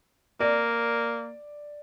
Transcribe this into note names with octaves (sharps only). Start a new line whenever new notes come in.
A#3 D5